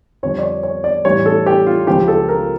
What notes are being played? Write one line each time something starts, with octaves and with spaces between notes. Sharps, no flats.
F2 D3 G3 C#5
D5
C#5
C#5
D5
A2 E3 G3 C#5
A4
G4
F4
C#2 C#3 F3 G4
A4
A#4